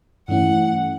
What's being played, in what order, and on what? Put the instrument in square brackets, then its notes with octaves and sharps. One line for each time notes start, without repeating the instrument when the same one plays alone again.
[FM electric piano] G2 E3 A3 C#4 E4 [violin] F#5